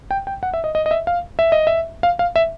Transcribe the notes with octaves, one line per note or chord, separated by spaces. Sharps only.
G5
G5
F#5
E5
D#5
D#5
D#5
E5
F5
E5
D#5
E5
F5
F5
E5